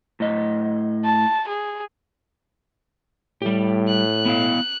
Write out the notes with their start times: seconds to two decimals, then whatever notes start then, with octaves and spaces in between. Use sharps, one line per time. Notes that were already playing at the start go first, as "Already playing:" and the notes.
0.20 A2 D#5
1.05 A5
1.48 G#4
3.42 A2 G3 G4
3.88 F#6
4.26 B3 E4 F5